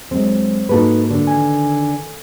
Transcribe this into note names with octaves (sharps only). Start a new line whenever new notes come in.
D2 F#3 G#3 C4
G#2 A#3 D#4 F#4 A4 B4
D3
D#3 G#5